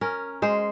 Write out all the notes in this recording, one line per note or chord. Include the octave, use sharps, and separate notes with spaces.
C#4 A#4
G#3 C5